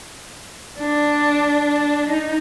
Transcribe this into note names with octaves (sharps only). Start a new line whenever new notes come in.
D4
D#4